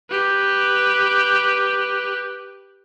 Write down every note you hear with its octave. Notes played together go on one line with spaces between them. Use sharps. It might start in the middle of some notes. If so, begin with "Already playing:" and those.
G4 B4